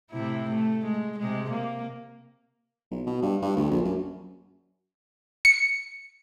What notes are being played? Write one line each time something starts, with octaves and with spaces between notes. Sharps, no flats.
A2 C3 E4
A3
G#3
C3 G#3
A#3
B1
B2
G2
G2
D2
A#1
F#2
C#7